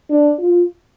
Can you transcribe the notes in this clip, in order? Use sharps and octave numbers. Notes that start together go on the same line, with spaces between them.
D4
F4